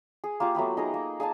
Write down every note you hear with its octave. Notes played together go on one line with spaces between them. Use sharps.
G#4
A#3 F4 G4 F5
F#3 A3 B3 G4
D#4 G#4 A#4
A#3
G#4 F5 G#5 A5